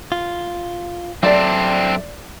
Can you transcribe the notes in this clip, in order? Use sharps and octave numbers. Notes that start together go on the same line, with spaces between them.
F4
F#3 C4 D4 A4 D5 E5